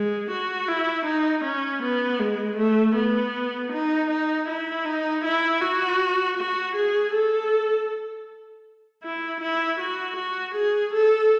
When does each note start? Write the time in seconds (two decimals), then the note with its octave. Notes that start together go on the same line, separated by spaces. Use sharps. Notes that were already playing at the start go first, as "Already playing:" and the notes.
Already playing: G#3
0.31 F#4
0.68 E4
1.06 D#4
1.45 C#4
1.83 B3
2.20 G#3
2.58 A3
2.96 B3
3.72 D#4
4.10 D#4
4.49 E4
4.85 D#4
5.25 E4
5.61 F#4
6.37 F#4
6.76 G#4
7.14 A4
9.04 E4
9.41 E4
9.79 F#4
10.17 F#4
10.55 G#4
10.94 A4